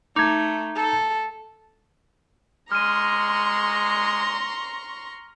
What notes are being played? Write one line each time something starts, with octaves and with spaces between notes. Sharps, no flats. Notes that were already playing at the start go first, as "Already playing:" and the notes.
A3 D#4 D6 G#6
A4
G#3 A#5 C6 C#6 F6 D#7